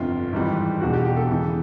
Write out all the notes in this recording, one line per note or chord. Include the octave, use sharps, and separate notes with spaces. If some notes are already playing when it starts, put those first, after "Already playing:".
Already playing: G1 F2 C3 F4
G#1 G#2 E3 G3
E1 E2 B2 G#3 F#4
G4
G4
A4
E2 C#3 E3 G#3